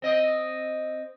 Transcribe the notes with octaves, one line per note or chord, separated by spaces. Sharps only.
C4 D#5